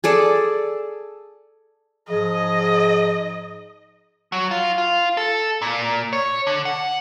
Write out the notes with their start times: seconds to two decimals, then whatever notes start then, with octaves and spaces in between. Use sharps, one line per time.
0.04 G#4 A4 D5
2.08 G#2 F3 G#4 D#5
4.32 F#3
4.51 F4
4.78 F4
5.17 A4
5.62 A#2
6.13 C#5
6.47 D3
6.65 F#5